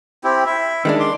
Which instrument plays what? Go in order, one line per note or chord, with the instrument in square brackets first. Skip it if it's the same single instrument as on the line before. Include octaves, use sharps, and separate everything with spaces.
[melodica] C4 E4 G4
E4 E5
[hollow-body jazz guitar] D#3 G#3 D4
[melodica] C6 D6